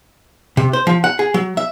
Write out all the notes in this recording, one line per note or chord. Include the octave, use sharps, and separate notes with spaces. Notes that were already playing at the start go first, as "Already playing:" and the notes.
C3
C5
F3
F#5
G#4
F#3
E5